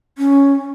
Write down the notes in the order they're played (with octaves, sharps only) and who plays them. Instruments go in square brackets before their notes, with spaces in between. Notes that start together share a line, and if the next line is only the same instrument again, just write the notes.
[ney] C#4